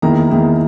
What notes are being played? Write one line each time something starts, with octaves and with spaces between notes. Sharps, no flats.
E2 D#3 A#3 E4 A#5
E2 D#3 A#3 E4